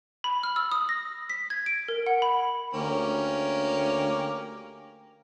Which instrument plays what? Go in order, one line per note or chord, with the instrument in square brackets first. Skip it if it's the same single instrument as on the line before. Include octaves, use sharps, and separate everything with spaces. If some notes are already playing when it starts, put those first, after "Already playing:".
[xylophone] B5
F6
E6
D#6
A#6
B6
G#6
D7
A#4
F#5
B5
[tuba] D2 [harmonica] A#3 C#4 G4